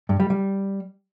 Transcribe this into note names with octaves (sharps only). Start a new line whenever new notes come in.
G2
G3
G3